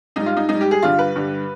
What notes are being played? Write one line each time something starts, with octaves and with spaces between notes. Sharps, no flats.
G#2 G3 D#4
F4
D#4
G#2 D#4
G3
G4
G#4
G2 D3 G3 F4
B4
G2 D3 G3